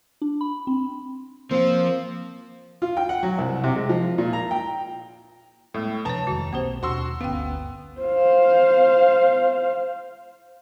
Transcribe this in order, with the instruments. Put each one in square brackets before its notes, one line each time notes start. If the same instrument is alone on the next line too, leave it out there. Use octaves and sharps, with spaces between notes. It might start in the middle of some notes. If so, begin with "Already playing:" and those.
[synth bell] D4
B5
C4
[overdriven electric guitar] F3 F4 [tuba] A#3 [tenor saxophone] C4
[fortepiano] F4
G5
F#5
F#3
C2
C3
G#3
F3
A#2
A#5
G5
[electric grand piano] A2 [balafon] G3 G#3 B3
[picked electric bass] C3 F3 D4 [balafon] B4 C#5 [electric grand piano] A5 A#5
[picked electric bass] F2 D#3 G#3 [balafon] F#4
[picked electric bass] B1 C4 [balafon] A#3 G4 C5
[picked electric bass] D#2 B2 D4 [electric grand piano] F#4 C6 E6
[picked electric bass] G1 D2 C#4 [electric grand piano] B3 [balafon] F5 G5
[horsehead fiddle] C5 F5